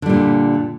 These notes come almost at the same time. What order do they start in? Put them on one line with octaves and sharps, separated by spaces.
D3 G3 A#2